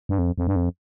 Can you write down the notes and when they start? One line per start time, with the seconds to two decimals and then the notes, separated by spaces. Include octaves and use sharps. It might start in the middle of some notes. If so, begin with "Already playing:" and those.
0.09 G2
0.18 F2
0.38 F2
0.47 G2
0.56 F2